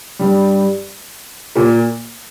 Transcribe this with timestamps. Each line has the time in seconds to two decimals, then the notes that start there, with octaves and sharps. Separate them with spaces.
0.19 G2 G3
1.56 A#2 A#3